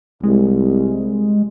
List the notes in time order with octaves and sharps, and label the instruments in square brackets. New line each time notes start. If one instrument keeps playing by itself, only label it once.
[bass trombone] C2 [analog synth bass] G#3